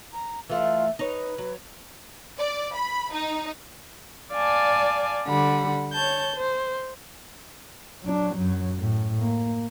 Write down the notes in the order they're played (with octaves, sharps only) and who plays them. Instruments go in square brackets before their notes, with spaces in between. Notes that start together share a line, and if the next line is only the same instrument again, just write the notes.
[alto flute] A#5
[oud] E3 A3 [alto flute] F4
[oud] D#4 C#5 [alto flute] B4
[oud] F#3
[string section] D5
B5
D#4
[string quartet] D5 F5 G#5 A5
D3 G3 F#5 B5
C#5 A5 G6
C5
[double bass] F#3 D4
F#2 F#3
A2
A#3